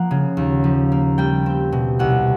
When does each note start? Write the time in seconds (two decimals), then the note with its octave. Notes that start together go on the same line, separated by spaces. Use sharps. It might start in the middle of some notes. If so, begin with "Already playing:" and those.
Already playing: F3 A#3 F#5
0.11 C#3
0.37 D#2
0.64 F3
0.92 A#3
1.18 G3 G5
1.46 C4
1.72 B2
1.99 C2 F#5